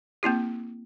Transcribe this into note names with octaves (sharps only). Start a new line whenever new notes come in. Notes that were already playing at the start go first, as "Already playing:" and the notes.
A#3 C4 E4 G4